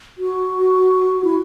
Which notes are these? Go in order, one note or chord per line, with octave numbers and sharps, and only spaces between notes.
F#4
E4